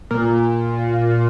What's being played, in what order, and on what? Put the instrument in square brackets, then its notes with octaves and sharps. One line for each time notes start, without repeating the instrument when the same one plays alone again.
[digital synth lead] A#2